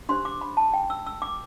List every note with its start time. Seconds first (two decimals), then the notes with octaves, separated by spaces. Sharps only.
0.09 D4 G4 C5 C6
0.25 D6
0.41 B5
0.57 A5
0.74 G5
0.90 E6
1.06 E6
1.22 D6